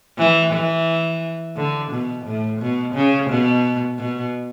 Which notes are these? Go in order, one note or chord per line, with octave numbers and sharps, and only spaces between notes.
E3
E3
D3
B2
A2
B2
C#3
B2
B2